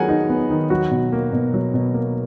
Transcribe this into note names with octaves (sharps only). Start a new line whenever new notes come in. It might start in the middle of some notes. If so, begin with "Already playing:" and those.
Already playing: D#3 F#3 B3 G#4 A#4 F#5 G#5
D#4
B3
D#3
F#3 F#4 F#5
B2
A#3
B2
F#3
B2
A#3